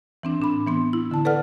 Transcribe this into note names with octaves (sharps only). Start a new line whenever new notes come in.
E3 C4 D4
A2 D4 B5
E3 B3 C6
E4
D3 A5
A4 B4 D5 F#5 F6